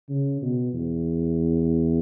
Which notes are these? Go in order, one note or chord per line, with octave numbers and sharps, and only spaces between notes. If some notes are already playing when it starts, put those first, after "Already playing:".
C#3
B2
E2